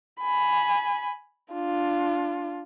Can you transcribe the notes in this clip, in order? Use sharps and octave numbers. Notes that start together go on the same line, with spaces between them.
G#5 B5
D4 F4